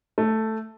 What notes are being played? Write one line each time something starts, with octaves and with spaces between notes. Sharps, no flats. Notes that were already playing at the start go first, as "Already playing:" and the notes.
A3